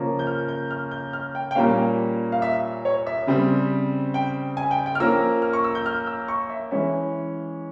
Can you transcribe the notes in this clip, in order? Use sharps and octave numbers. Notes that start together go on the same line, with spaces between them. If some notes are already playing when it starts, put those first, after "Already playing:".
Already playing: C#3 F3 A#3 C#4
G6
F6
G6
F6
G6
F6
G5
G5
A#2 G3 A#3 C#4 F5
F5
E5
C#5
E5
C#3 G3 C4
G5
G#5
G5
G5
F6
F3 A#3 C#4 E6
F6
C#6
E6
G6
F6
E6
C#6
E5
E3 G#3 C#4 E5